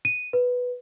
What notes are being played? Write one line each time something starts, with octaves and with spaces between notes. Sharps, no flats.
D#7
B4